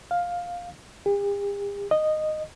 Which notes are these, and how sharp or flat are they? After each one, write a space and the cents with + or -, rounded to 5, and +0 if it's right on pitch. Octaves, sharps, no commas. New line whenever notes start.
F5 +10
G4 +45
D#5 -10